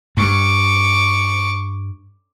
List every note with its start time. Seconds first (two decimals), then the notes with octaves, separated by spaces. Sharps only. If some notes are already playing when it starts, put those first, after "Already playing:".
0.17 G2 C#6 D6